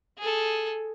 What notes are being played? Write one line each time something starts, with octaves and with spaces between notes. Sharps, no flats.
G#4 A4